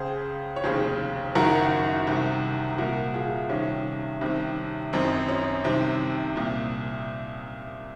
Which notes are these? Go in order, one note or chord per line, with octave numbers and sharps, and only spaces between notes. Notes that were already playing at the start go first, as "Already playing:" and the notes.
Already playing: C#2 C#3 G#4 C5
C#5
F1 D#2 C#3 G#4 C5
F#1 F#2 D#3 F#4 A#4
C2 C3 D#3
C2 A#2 F#4 A#4
F4 G#4
C2 C3 D#3 C#4
C2 C3 D#3
G#1 F#2 D#3 C4 D#4
C#4
C2 C3 D#3 C4
C2 A#2